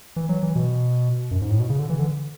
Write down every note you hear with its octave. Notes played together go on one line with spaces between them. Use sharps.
E3
F#3
E3
B2
F#2
G#2
A2
B2
C#3
D3
E3
D3